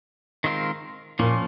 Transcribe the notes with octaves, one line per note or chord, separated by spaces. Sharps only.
D#3 G#3 C4 F4 A#4
A#2 F3 A#3 C#4